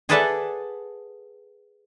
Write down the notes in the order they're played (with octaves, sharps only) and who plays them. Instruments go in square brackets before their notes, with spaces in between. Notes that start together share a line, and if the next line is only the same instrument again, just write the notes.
[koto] G#4 A4 B4 D5 E5 F#5